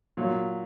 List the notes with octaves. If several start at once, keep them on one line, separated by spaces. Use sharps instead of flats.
A#2 F#3